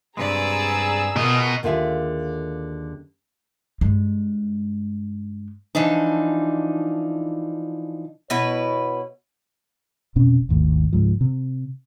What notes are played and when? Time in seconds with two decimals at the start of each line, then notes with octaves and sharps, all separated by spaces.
0.17 G2 C3 G#3 G#4 B4 D5 A#5 E6
1.16 B2 F4 A#4 D#5
1.63 D#2 D3 F4 G#4 E5
3.81 G2 G#3
5.75 E3 F3 D4 D#4
8.30 B2 E4 B4 C#5
10.16 F1 B2 C4 C#4
10.49 G#1 D#2 A2
10.93 C#2 G#2 F3
11.21 C3